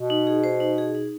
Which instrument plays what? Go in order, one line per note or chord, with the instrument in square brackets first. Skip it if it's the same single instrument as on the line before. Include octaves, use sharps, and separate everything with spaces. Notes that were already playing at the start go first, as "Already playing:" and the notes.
Already playing: [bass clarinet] B2
[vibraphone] D#4
G#4
C5
D#4
G#4
D#4